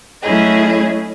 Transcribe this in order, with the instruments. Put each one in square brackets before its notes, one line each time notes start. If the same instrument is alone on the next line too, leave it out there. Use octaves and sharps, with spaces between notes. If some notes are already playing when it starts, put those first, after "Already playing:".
[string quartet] F#3 A3 C#4 E4 G#4 D#5